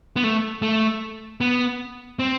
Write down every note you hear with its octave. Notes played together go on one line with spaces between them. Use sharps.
B3
A3
A3
B3
C4